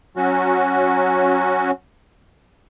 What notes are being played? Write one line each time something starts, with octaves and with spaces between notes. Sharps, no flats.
F#3 C#4 F#4